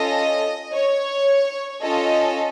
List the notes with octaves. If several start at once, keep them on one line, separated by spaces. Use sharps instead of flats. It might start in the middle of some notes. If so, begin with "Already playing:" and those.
Already playing: C#4 F4 A4 D#5
C#5
C#4 F4 A4 D#5